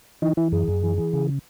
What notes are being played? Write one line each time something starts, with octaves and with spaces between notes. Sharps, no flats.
E3 D#4
E3 E4
F#2 G#4
F#2
E3
E3
C#3